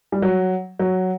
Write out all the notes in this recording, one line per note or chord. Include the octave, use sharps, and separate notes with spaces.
G3
F#3
F#3